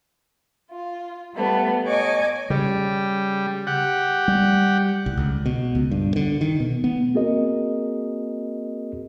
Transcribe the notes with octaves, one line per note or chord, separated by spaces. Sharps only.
F4
G3 A3 B3
C#5 D#5 G#5 C#6 D6
C#3 G3
G4 F#5
G3
C2
C#2
B2
C#2
G2
D3
D#3
B2
B3
A#3 C4 F#4 G#4 A#4 D#5